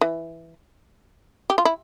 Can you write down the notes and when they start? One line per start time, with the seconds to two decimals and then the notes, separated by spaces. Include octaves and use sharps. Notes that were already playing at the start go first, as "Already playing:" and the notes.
0.01 E3
1.50 G4
1.58 F4
1.65 E4